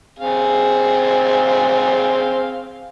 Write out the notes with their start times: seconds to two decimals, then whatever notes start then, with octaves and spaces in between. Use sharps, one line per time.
0.19 C4 G#4 F5